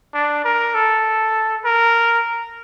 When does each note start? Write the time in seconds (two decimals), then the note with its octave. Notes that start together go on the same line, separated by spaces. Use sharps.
0.14 D4
0.44 A#4
0.74 A4
1.65 A#4